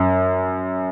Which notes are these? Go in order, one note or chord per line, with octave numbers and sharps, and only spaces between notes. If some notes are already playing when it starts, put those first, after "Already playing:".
Already playing: F#2